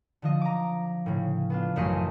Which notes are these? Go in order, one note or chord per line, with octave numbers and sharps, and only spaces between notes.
D3 F3 D#5
A#5 D6
A2 C#3
B3 D4 F4
A1 F#2 A3 D#5 C6 C#7